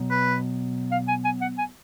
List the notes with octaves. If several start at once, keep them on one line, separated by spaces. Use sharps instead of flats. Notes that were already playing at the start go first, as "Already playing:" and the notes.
Already playing: B2 F#3 B3
B4
F5
G#5
G#5
F#5
G#5